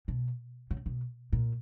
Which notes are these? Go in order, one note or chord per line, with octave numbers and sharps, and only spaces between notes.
B2
C#3
B2
A#2